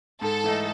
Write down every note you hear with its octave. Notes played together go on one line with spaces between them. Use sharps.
G#2 A4
E3 A3 D#4